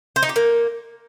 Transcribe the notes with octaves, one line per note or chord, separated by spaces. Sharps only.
C5
D#4
G4
A#3